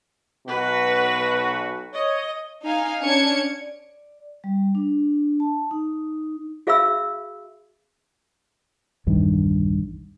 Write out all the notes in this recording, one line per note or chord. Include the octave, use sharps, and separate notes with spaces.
B1 B2 F#4 B4
C#5 D#5
D#4 F5 G#5
C#4 D4 G#6 C#7
D5
G3
D4
A5
D#4
F#4 G#4 E5 F5 B5 E6
B1 E2 G2 D#3